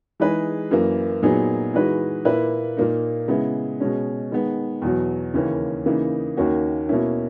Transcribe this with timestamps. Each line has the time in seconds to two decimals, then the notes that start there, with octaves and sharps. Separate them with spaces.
0.20 E3 G#3 D#4 G#4 B4
0.71 F#2 E3 A#3
1.22 A#2 F#3 B3 D#4 G#4
1.74 E3 G#3 D#4 F#4 B4
2.25 A#2 A#3 E4 B4
2.77 A#2 A#3 D#4
3.28 C#3 G#3 B3 E4
3.80 B2 G#3 C#4
4.31 D#3 G#3 B3
4.82 E2 B2 F#3
5.34 D#2 C#3 E3 A#3 C#4
5.86 C#3 E3 A#3 D#4
6.37 D#2 D#3 A#3 C#4 F#4
6.89 B2 A#3 C#4 E4